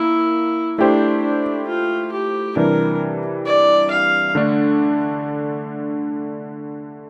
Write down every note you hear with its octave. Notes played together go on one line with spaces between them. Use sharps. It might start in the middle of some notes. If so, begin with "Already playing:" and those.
Already playing: A#3 E4
A3 D4 E4 G4 C5
D4
F4
G4
C3 E3 G3 D4 A#4
D5
F5
D3 A3 D4